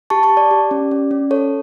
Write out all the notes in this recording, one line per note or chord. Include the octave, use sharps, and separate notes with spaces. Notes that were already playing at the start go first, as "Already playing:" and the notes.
G4 A5 C#6
A5 C#6
G4
D5
G4
C#4
C#4
C#4
A4 C#5